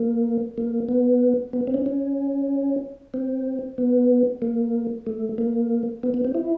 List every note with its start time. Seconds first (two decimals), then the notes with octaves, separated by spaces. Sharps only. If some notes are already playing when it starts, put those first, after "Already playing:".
Already playing: A#3
0.58 A#3
0.89 B3
1.53 B3
1.67 C4
1.74 C#4
1.86 C#4
3.14 C4
3.78 B3
4.42 A#3
5.07 A3
5.38 A#3
6.03 B3
6.14 B3
6.25 C4
6.35 E4